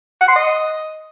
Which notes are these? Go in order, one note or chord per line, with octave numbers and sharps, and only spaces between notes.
F#5
C6
D#5